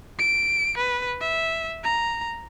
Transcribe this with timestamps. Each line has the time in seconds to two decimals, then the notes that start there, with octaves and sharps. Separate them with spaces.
0.19 D7
0.78 B4
1.21 E5
1.84 A#5